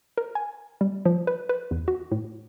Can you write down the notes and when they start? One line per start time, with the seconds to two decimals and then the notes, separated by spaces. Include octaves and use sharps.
0.18 A#4
0.35 G#5
0.81 G3
1.05 F3
1.27 B4
1.49 B4
1.71 E2
1.88 F#4
2.12 A2